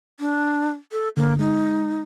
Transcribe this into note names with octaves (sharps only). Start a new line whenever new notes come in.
D4
A4
G1 D3 A#3
G#3 D#4